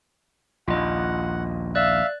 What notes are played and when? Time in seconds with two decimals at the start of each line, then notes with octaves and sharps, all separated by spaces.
0.68 A#1 D#2 F4 D#5 F#5
1.75 D5 E5 F5 F#6